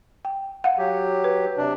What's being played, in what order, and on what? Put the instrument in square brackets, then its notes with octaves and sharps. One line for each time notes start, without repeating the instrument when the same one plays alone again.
[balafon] G5
F5 F#5
[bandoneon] F#3 G4
[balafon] B4
[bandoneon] C3 D4